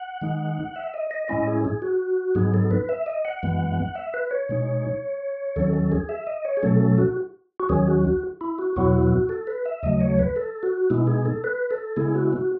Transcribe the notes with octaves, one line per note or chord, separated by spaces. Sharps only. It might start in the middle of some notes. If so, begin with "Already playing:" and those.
Already playing: F#5
D#3 G#3 D#4
E5
D#5
D#5
A2 G#3 C#4 E4 D#5
G#4
G#4
F#4
G#2 F#3 B3 D#4 G#4
A4
B4
E5
D#5
F#5
F#2 E3 G#3 B3
E5
B4
C#5
B2 G#3 D#4
D#2 D#3 F#3 C#4 A4
A4
G#4
E5
D#5
C#5
G#4
B2 F#3 A3 C#4 A4
A4
F#4
F#4
D#2 D#3 F#3 C#4 G#4
F#4
F#4
E4
F#4
E2 B2 F#3 B3 E4 F#4
F#4
A4
B4
E5
D#2 C#3 F#3 A3 D#5
C#5
B4
A4
F#4
B2 G#3 B3 D#4 E4
G#4
A4
B4
A4
C#3 G#3 B3 E4 G#4
F#4
F#4